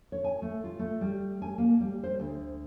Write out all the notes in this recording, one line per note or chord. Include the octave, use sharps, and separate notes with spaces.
C#5
G#5
A3
F4
A3
G3
G#5
A#3
G3
C5
D2